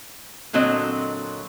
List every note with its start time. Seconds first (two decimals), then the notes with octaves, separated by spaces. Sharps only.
0.53 A#2 D3 F#3 C4 D#5